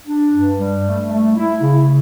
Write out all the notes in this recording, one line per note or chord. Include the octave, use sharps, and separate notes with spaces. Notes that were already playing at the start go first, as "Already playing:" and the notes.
D4
G2
G3
A3
A3
E4
C#3